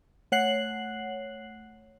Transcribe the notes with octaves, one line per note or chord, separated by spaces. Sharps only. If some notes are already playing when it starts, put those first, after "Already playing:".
A3 C#5 F#5 F#6 C7 F#7